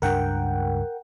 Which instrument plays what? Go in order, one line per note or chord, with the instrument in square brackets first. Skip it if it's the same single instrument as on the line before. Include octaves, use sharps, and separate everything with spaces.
[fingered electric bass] C#2 G2 D4 [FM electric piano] A#4 F#5 G5